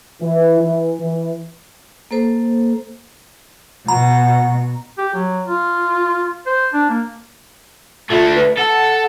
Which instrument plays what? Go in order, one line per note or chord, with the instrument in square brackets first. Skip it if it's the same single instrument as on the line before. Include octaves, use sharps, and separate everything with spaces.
[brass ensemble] E3
E3
E3
[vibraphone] A#3 A4 C5
[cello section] B2 [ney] F#5 [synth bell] A#5
[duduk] G4
F#3
F4
C5
D4
A#3
[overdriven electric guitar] D3 A3 [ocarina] F4
[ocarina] B4
[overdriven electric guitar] A4 [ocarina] F#5